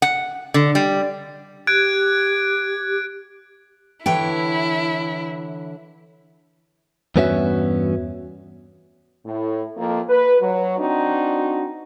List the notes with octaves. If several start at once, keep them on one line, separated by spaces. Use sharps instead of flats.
F#5
D3
G3
G4 F#6 G#6 D7
D3 E3 E4 C#5 G5
E2 G2 B3 C#4 F#4 E5
A2
F2 A#3
B4
F#3
C4 D4 D#4 F#4